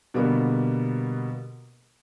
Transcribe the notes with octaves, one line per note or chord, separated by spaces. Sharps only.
B2 D3 G3 A#3 B3